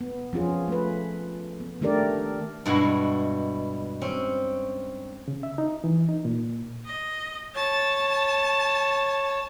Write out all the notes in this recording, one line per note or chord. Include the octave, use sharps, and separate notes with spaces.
B3
F3 C#4 F4 G#4
A3 B4
B3
D#3 A3 D4 G4 A#4 D5
G2 B2 G#3 E4 F#4
C4 C#4
C#3
E5
D#4
E3
D#4
A#2
D#5
C#5 A5